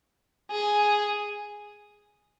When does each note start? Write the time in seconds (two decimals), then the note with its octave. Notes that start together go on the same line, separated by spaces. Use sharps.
0.51 G#4